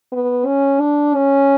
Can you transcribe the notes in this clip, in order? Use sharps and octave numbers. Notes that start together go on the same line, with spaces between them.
B3
C#4
D4
C#4